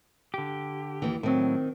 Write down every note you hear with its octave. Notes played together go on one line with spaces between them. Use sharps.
D3 G4
D#2 E3
A2 D#3 F#3 C4